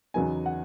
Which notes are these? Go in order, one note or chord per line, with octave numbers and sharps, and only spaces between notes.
E2 C#3 F#3 B3 D#4 G#5
F#5